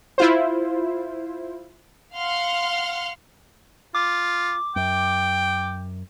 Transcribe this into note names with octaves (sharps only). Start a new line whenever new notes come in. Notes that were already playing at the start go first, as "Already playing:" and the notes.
E4 F4 C5
F5 F#5 C6 F6
F4 D6
F#2 G5